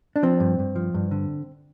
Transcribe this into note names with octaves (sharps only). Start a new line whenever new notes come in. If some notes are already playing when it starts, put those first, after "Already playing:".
D4
F3 C4
G2
G2
F3
G2
D3